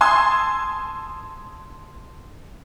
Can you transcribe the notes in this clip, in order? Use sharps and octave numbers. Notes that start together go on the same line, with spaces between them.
G#5 A5 C6 D#6 E6 G#6